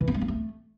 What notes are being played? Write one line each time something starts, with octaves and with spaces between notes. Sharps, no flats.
E3
B3
A3
A#3
A3